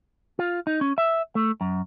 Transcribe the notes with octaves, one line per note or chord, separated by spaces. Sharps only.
F4
D#4
C#4
E5
A3
F#2